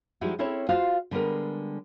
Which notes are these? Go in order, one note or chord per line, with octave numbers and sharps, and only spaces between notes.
F3 G3 G#3 D#4 E4 F#4
C4 C#4 E4 A4 C#5
F4 F#4 C5 F5
D3 G3 G#3 B3 A#4